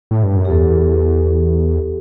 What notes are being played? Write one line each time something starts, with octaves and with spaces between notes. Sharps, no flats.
A2
G2
F#2
G4
E2 A4